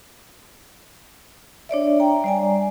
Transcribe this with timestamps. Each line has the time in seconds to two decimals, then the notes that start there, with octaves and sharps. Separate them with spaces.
1.69 D4 C#5 D5 E5
2.00 G5 A#5
2.24 G3 D5 G#5